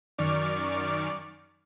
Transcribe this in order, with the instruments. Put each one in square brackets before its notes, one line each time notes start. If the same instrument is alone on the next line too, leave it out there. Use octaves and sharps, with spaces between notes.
[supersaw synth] F#2 D#3 D5 C#6 D6 F6